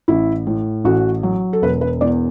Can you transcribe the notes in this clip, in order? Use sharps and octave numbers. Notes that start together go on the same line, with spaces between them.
A1 E4
A2
A1 F#4
F#3
A4
E1 B4
B4
E2 D5